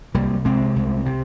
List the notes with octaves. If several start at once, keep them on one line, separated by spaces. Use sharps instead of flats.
C2 G3 A#3
C3 G#3 C4
C2
C3